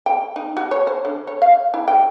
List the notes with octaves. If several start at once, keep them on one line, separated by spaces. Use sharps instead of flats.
G5
D#4
F#4
C#5
C5
D3
C#5
F5
E4
G5